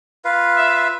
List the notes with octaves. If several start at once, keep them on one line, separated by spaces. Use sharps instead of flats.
F4 B4 F5
E5